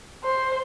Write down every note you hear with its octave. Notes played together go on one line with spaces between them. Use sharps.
C5